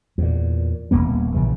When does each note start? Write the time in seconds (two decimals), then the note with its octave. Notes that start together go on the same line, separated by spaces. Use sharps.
0.18 E2 A#2
0.91 D#1 A#2 A#3 B3
1.34 A#1 C#3 E3